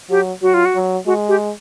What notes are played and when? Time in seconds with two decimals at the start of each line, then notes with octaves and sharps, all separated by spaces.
0.10 F#3 G4
0.42 F#3 F#4
0.54 F4
0.65 F#4
0.75 F#3
1.06 G#3 F#4
1.28 G4